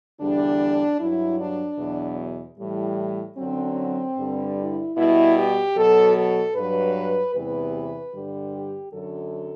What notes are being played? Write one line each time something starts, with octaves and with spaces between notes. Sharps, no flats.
E2 D3 G3 D4
G2 F#3 E4
D4
E2 B2 F#3
A2 E3 G3
F#2 D3 F#3 C4
G2 D3 G3
E4
B2 G3 E4
G4
B2 F#3 A4
A4
G2 F#3 B4
E2 C3 E3 G3 B4
G2 D3 G3
G4
F#2 D3 F#3 A4